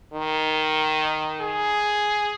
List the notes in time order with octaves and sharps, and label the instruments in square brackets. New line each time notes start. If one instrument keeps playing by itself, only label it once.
[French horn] D#3
[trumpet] G#4